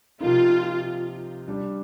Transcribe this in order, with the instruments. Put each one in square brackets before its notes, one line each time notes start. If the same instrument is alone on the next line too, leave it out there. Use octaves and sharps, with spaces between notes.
[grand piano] C3 F3 A#3 D#4 [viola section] F4
[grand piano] G3 D4 G4 D5